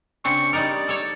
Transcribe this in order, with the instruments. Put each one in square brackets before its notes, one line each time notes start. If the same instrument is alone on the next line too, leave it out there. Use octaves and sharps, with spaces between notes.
[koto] C#3 C4 D4 [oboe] C#6
[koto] G3 D#4 A#4 [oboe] D5
[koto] A4 C#5